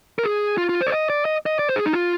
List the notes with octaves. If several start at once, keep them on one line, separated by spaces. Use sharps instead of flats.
A#4
G#4
F4
F4
C5
D5
D#5
D5
D#5
D#5
D5
C5
G#4
D#4
F4